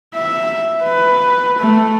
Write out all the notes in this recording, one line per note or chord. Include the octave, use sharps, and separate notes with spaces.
E5
B4
A3